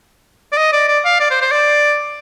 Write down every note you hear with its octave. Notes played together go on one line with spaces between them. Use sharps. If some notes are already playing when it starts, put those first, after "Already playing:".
D5
D#5
D5
D5
F5
D5
C5
C5
D5